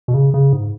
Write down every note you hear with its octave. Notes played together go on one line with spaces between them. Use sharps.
B2
C#3
C#3
G#2